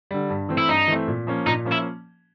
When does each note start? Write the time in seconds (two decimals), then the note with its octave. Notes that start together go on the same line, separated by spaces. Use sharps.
0.11 D3 G3
0.30 G2
0.49 E3 A3 C4
0.58 E4
0.69 G2 D#4
0.88 E3 A3 C4
1.08 A#2
1.27 F3 A#3 C#4
1.46 A#2 D#4
1.65 F3 A#3 C#4
1.72 E4